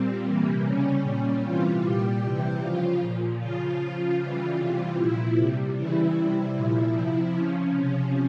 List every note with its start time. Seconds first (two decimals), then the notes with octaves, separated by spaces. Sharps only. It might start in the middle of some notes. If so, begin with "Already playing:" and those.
Already playing: A#2 G3 C4
0.25 C3 E3 G3 A#3
0.64 C#3 G3 C#4
1.03 A#2 G3
1.43 C3 E3 G3 F4
1.82 A#2 G3 G4
2.22 C3 E3 G3
2.61 C#3 F3 F4
3.00 A#2 F3
3.40 C#3 F3 F4
3.80 C#3 F3
4.19 C#3 E3 G3 F4
4.59 C3 E3 G3
4.98 A#2 F3 E4
5.37 C3 G3
5.77 C#3 E3 G3 E4
6.17 C3 G3
6.56 A#2 F3 E4
6.96 C3 F3
7.35 C#3 F3 C#4
7.75 C3 F3